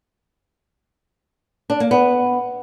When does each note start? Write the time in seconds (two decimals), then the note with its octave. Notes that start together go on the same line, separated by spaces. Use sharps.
1.70 D4
1.80 A#3
1.91 B3